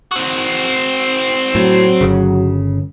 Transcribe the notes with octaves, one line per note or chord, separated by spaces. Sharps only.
C4 F#4
A2 F#3
G1 C#3